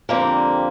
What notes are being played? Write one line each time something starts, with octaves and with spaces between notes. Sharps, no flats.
F2 D3 G3 A#3 C4